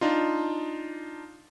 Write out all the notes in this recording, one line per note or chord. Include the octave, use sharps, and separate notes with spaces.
D4 D#4 F4